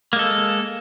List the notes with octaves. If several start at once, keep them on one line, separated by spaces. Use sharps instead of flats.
G#3 A#3 A4